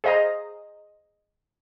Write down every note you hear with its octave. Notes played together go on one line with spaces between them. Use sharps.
G#4 C5 D#5 F5 A#5